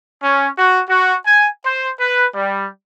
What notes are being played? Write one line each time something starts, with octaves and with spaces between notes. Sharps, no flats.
C#4
F#4
F#4
G#5
C5
B4
G3